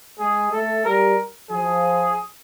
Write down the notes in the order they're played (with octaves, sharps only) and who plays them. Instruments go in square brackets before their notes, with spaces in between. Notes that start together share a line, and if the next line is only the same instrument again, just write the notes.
[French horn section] G#3 [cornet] G#4
[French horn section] A3 [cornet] A4
[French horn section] G3 [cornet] A#4
[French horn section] F3 [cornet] G#4